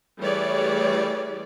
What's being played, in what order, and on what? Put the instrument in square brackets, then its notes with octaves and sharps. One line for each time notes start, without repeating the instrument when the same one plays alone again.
[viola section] E3 G3 A3 G#4 C#5 D5